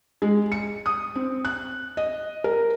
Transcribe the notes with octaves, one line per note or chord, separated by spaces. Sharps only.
G#3
C#7
D#6
C4
F#6
D#5
A#4